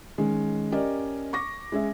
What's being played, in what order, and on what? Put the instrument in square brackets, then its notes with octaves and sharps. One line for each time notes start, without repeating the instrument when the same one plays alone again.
[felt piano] D#3 G#3 C#4
C#4 G4 A#4 D5 D#5
C#6 D6 A#6
G#3 C#4 G#4 E5